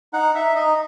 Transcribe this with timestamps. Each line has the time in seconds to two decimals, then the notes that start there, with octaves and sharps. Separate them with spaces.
0.13 D#4 F#5
0.35 D#4 E5
0.55 D#4 D#5